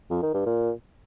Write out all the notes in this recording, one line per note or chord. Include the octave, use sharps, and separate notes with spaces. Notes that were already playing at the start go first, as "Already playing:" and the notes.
F2
D#3
G2
A#2